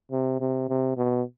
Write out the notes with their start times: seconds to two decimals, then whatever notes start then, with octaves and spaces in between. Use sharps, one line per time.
0.11 C3
0.40 C3
0.69 C3
0.97 B2